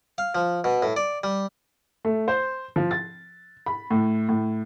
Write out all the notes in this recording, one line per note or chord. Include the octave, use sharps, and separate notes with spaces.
F5
F3
B2
A2
D5
G3
A3
C5
F3
A6
B5
A2
A2